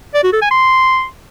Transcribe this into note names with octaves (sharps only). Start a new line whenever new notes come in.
D5
F#4
A4
G#5
C6